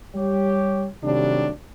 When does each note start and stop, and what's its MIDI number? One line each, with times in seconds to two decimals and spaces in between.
0.15 0.86 55
0.15 0.86 67
0.15 0.86 73
1.04 1.50 48
1.04 1.50 51
1.04 1.50 54
1.04 1.50 55
1.04 1.50 57
1.04 1.50 62